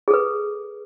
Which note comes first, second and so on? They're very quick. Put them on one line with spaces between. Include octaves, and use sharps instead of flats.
G#4 A4 B4